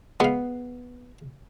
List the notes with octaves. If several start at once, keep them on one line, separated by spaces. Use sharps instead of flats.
G#3 B3 F5